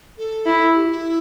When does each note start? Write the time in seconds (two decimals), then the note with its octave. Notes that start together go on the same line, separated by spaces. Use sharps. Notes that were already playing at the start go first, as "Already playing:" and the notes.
0.18 A4
0.46 E4
0.74 G4
0.88 E4